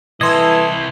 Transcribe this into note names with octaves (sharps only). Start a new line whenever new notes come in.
C3 E3 E4 A4 D#5 A5 C6 G#6